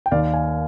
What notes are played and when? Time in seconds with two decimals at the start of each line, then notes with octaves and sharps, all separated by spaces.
0.06 G5
0.11 D#2 D#3 D5 F5
0.33 F5 G#5